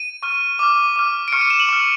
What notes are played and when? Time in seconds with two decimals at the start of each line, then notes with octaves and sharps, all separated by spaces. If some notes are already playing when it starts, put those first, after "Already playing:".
Already playing: D#7
0.23 C#6 F6
0.59 D6 F6
0.96 D6 F6
1.28 D7
1.32 C#6 F6 C#7
1.41 D#7
1.50 E7
1.60 F#7
1.69 C#6 F6